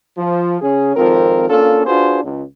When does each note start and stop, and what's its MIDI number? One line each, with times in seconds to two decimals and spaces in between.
0.18 0.57 53
0.61 0.94 49
0.61 0.94 61
0.61 0.94 68
0.96 1.49 32
0.96 1.49 41
0.96 1.49 53
0.96 1.49 60
0.96 1.49 70
1.49 1.84 58
1.49 1.84 61
1.49 1.84 62
1.49 1.84 65
1.49 1.84 69
1.86 2.23 62
1.86 2.23 65
1.86 2.23 66
1.86 2.23 68
1.86 2.23 71
1.86 2.23 72
2.24 2.43 37